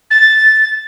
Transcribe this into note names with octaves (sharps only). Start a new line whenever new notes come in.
A6